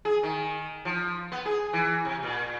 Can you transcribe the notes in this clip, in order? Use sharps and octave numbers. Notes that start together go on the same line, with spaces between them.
G#4
D#3
F3
B3
G#4
E3
C3
A#2